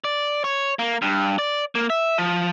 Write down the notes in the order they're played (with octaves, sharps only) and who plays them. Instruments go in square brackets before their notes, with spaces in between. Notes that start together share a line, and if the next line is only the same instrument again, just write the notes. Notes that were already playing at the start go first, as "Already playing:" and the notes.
[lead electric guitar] D5
C#5
A#3
G2
D5
A#3
E5
F3